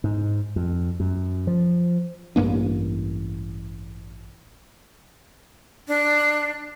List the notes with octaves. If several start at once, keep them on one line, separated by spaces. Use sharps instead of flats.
G#2
F2
F#2
F3
A1 G2 A#3 D4
D4